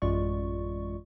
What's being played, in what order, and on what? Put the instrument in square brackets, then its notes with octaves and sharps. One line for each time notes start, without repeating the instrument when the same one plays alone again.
[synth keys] A1 F#2 G#3 F4 D5 C#6